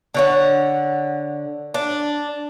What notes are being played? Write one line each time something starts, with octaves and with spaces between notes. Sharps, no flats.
D3 C#5 F#5
D4